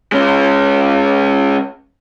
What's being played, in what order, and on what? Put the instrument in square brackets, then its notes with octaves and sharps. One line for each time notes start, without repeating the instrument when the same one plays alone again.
[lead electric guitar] G#3 C#4